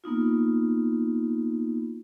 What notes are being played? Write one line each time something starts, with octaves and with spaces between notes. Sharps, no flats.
A#3 B3 D#4 F4